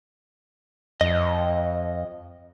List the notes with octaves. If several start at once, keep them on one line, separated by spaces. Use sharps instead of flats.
F2 D#5